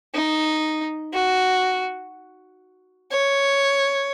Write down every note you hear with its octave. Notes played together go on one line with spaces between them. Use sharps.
D#4
F#4
C#5